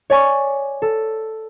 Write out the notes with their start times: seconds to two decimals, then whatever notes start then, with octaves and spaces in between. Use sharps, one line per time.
0.10 C#5 D5 G#5 C#6
0.82 A4